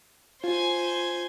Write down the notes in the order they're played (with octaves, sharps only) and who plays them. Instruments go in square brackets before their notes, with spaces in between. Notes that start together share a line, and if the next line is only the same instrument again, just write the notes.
[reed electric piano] F4 [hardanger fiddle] C5 G#5